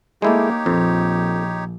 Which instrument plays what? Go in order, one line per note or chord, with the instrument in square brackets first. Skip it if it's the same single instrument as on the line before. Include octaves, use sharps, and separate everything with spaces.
[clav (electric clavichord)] G#3 E4 A4 [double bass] A#3 [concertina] D#4 G4 C#5
[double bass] A#1 [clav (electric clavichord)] F2